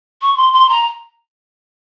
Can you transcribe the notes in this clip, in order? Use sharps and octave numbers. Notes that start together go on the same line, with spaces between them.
C#6
C6
C6
A#5